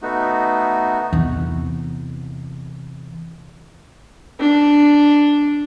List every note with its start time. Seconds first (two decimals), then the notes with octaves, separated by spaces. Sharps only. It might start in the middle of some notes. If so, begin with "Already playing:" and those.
0.02 A3 B3 D#4 F#4
1.13 E2 C3
4.40 D4